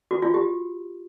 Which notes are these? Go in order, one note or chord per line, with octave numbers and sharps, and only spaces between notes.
F#4
F4
G4